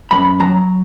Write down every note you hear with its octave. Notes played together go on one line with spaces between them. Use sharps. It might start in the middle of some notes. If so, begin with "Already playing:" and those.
F#2 B5
F#3 A#5